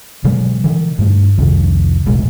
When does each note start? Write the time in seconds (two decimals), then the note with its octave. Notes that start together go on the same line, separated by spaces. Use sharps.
0.24 B2 D3 F#3 G#3
0.64 D3 E3
0.99 G2 A3
1.38 C2 F2 C3 D#3
2.06 E1 B1 A2 G#3